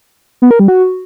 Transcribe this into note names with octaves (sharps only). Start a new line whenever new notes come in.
B3
A#4
G3
F#4